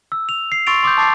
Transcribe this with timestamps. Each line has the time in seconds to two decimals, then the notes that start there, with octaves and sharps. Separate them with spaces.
0.12 E6
0.29 F7
0.52 C7
0.67 C6 C#6 E6 A6 D7 F7
0.83 C6 D6 D#6 G6
0.98 A5 D6 A6 C7